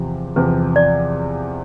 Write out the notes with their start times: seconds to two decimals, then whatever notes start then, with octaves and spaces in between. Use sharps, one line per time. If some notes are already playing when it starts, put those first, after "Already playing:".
Already playing: E2 C3 F3 G4
0.36 E2 C3 F3 B4
0.76 D5